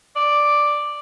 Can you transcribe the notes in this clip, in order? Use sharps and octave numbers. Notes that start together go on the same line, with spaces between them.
D5